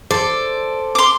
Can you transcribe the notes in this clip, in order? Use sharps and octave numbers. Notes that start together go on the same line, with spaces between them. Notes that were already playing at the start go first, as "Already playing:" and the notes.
A4 C5 D5
C6 D6